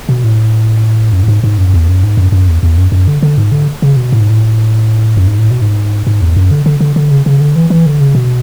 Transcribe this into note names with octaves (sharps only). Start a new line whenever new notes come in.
B2
A2
F#2
A2
G#2
G#2
F#2
E2
F#2
G#2
F#2
F#2
E2
E2
F#2
F#2
D3
D3
G#2
D3
C#3
B2
A2
G#2
A2
F#2
G#2
A2
B2
G#2
G#2
E2
F#2
D3
D3
D3
D3
C#3
C#3
D3
E3
E3
D3
C#3
B2